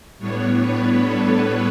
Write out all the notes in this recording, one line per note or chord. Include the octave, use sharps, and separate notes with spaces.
A2 G3 B3 D4 C#5
B4
A4